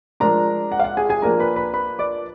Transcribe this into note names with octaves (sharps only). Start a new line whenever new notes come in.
F3 G#3 D4 A#4 A#5
F#5
F5
F#5
G#4 G#5
G#4 G#5
F3 A#3 D4 A#4 A#5
B4 B5
B4 B5
B4 B5
D5 D6